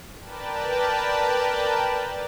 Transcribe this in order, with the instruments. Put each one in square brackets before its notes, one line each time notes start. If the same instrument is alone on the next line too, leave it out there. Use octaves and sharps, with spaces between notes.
[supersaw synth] A#4 B4 D5 G5 A5